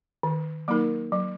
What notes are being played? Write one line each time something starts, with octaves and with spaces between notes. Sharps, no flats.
D#3
F#3 A#3 D#4 A#4
F#3